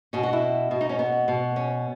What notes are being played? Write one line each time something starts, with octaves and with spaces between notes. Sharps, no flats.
B2 C#4
F#4
E4
B2
D#4
C#4
B3
B2
C#4